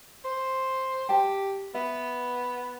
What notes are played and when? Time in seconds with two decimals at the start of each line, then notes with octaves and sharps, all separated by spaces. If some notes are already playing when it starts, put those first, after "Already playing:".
0.25 C5
1.09 G4 G5 A5
1.74 B3 E5